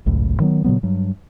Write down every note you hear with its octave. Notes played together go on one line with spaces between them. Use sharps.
G#1 C#2 F#2 A2
D#3 F#3 B3
A#2 C#3 F#3 B3
G2 F#3